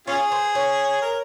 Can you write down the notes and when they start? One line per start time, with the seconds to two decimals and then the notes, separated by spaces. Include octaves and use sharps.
0.07 C#4 F4 G#4 C#5
0.32 C5
0.55 C#5
1.02 A#4